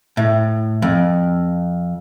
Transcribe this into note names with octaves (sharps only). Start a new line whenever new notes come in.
A2
F2